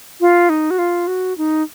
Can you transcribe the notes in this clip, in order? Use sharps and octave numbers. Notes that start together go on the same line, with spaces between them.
F4
D#4
F#4
F4
F#4
D#4